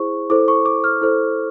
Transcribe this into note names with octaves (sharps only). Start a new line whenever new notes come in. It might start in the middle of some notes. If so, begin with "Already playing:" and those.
Already playing: E4 G#4 C5 C#6
E4 A4 C5 D6
C#6
D6
F6
E4 A4 C5